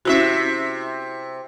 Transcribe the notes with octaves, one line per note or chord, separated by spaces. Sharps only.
C3 C#4 E4 F#4 A#4 E5